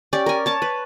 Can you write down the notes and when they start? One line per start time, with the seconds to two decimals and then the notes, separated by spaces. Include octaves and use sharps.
0.13 C#4 G4 D5
0.26 A#4 G#5
0.46 C#5 A5 D6
0.62 B4